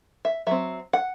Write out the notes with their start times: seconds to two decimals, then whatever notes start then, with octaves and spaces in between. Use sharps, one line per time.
0.25 E5
0.47 F#3 C4 E5
0.93 F#5